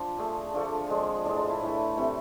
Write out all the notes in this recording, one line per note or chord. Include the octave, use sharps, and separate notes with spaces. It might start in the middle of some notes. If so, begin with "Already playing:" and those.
Already playing: F3 D4 F4
D3 A3 G#4
D3 F3 A3 D4
D3 F3 G#3
A2 G#3 D4
D4
E4
A2 E3 A3
C3 E3 A3